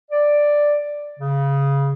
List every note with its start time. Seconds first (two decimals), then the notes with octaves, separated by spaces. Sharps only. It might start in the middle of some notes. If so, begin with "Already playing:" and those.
0.11 D5
1.19 C#3